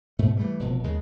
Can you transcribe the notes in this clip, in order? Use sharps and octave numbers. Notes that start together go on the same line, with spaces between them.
G#2 B2 A3
E3 G3 A3 A#3
F1 B2 F3
D#2 C#3 G#3